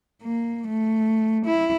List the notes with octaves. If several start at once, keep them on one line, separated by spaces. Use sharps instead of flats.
A#3
A3
E4